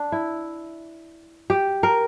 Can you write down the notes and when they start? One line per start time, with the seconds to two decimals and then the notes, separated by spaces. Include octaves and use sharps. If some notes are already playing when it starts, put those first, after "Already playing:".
Already playing: D4
0.12 E4
1.50 G4
1.83 A#4